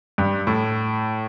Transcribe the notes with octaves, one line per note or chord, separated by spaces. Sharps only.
G2
A2